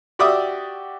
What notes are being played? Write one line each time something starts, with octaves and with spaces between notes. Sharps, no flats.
F#4 G4 D5 E5 D6 D#6